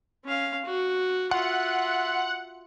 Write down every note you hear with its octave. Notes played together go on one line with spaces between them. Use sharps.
C#4 F5
F#4
F4 E5 F#5